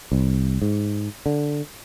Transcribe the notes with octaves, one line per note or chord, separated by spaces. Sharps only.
C2
G#2
D3